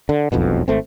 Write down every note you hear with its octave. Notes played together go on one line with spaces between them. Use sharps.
D3
E1 B1 F2 B2
G#1 A3 C4